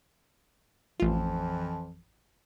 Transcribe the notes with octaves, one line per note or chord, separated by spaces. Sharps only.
A1 F2 E3 F3 F4